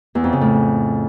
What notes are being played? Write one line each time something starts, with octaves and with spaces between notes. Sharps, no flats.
E2
F2
C#3
A2